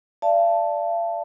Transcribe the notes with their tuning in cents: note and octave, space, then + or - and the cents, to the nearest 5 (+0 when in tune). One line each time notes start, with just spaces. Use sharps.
D5 +0 F5 -40 A5 +0